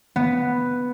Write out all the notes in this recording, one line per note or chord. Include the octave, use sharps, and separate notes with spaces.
B3